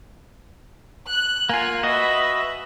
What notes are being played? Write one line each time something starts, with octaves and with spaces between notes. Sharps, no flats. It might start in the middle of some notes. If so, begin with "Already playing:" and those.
F#6
A#3 F4 F#5 G#5
F#4 B4 D#5 E5